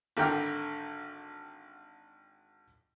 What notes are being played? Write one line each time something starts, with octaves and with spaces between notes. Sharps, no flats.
G#1 D3 A#4 G5 F6